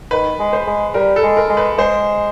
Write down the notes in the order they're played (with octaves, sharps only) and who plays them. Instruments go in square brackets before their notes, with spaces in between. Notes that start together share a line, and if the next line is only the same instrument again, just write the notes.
[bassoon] D#3 [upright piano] B4
[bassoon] G#3
[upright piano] C5
[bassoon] G#3
[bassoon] G3 [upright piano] A#4
[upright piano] A4
[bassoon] G#3
[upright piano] A#4
[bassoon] G#3
[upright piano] B4
[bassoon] G#3 [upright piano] C5